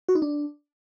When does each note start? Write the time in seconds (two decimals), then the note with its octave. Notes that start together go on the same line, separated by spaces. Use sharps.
0.09 F#4
0.15 D#4
0.22 D4